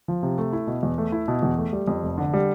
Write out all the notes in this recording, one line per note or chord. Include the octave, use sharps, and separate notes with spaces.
F3
C3
A3
E4
B2
E2
A3
E4
B2
E2
A3
G3
F2
F1
D3
G3